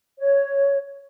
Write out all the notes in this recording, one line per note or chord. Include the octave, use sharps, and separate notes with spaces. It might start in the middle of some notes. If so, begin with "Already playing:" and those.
C#5